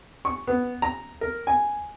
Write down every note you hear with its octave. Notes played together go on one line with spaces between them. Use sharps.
C#6
B3
A#5
A#4
G#5